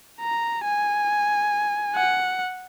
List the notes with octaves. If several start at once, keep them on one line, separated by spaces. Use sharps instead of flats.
A#5
G#5
F#5